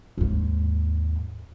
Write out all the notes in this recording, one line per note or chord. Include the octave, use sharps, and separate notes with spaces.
D#2 G#2